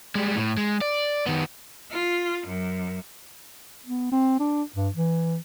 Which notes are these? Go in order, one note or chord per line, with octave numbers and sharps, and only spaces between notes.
G3 G#3
A2
G#3
D5
D#3 B3
F4
F#2
B3
C4
D4
G2
E3